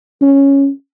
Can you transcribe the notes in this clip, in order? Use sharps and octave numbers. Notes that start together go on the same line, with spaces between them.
C#4